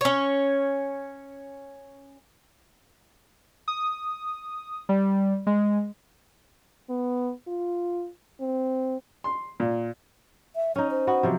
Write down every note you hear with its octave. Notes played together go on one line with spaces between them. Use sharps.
C#4 C#5
D#6
G3
G#3
B3
F4
C4
C6
A#2
E5
C#4 D#4 C#5
C5
B3 F#4
C3 F3 F#3